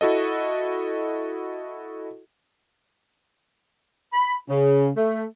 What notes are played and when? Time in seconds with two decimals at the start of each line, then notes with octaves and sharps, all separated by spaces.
0.01 E4 F#4 A4 D#5
4.13 B5
4.49 C#3
4.97 A3